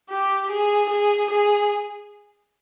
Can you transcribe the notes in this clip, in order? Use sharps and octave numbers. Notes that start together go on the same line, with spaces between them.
G4
G#4
G#4
G#4